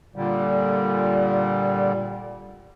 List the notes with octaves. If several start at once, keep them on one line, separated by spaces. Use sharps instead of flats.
A#2 D3 G3